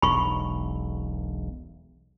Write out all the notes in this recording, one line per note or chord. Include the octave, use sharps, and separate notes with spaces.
E1 B1 B5 C#6